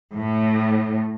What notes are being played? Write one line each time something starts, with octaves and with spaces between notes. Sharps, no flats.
A2